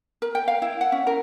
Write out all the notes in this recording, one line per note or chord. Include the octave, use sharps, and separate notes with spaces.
A#4
G5
F5
E4
F#5
C#4
A#4